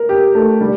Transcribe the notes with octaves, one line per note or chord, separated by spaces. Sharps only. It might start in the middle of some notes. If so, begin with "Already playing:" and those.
Already playing: A#4
G4
A3
G3